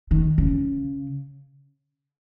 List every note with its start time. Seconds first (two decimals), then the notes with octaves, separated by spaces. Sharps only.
0.11 D#3
0.38 C#3